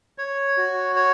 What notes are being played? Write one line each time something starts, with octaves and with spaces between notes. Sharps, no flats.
C#5
F#4
C#5